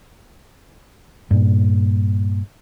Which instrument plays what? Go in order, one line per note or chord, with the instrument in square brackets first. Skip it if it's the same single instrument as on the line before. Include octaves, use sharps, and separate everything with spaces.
[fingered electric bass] G2 A#2